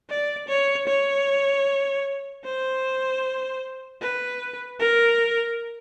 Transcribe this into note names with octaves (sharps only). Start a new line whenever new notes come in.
D5
C#5
C#5
C5
B4
A#4